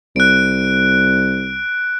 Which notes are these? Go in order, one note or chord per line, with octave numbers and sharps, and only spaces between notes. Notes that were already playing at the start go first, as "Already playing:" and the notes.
C2 F#6 D7